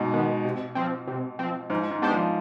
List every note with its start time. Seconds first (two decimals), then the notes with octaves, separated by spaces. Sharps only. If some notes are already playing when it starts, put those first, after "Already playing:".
Already playing: G#2 B2
0.13 D#3 B3
0.45 C3
0.75 F3 C4
1.07 C3
1.39 F3 C4
1.70 G#2 F3
1.91 G#2
2.02 B3 D4 G4 C5
2.12 F3